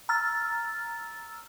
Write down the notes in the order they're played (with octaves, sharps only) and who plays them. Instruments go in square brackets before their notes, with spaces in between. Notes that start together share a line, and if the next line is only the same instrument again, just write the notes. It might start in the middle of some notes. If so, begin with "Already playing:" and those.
[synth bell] A#5 E6 F6 A6